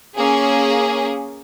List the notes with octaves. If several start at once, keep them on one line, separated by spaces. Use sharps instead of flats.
A#3 C#4 G#4